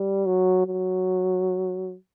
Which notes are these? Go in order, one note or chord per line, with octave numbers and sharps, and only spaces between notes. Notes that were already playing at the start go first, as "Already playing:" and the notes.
Already playing: G3
F#3
F#3